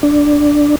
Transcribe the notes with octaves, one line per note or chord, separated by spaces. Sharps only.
D4